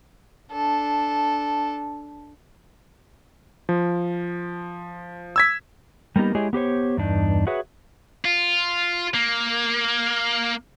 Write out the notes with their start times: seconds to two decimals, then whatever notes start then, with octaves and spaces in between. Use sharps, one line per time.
0.51 D4 A4
3.69 F3
5.36 E6 G#6 B6
6.16 G3 A#3 B3 D#4 G4
6.35 G#3 E4 G4 G#4 C#5 D#5
6.53 B3 G4 C5 C#5
6.97 E2 G2 D4 D#4
7.47 F#4 G#4 B4 C#5 E5 F#5
8.25 F4
9.14 A#3